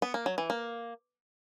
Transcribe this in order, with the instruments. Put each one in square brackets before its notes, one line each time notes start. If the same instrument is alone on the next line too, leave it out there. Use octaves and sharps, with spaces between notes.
[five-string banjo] B3
A#3
F#3
E3
A#3